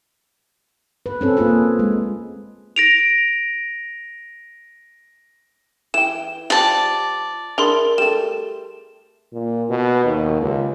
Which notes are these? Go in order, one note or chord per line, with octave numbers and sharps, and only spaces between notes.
B4
C4 C#4 A4
A#3 F4 G#4 B4
G#3
A#6 D7 F7
E3 G5 E7
F3 G4 D5 A5
D4 E4 G#4 A#4 C6
G3 A3 E7
A#2
B2
D#2
C#2